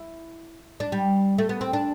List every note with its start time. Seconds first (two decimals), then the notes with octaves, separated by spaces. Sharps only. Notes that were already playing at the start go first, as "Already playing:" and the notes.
Already playing: E4
0.80 D4
0.92 G3
1.38 A3
1.49 B3
1.61 C4
1.73 D4